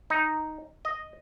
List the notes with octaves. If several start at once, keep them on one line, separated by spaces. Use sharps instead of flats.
D#4
D#5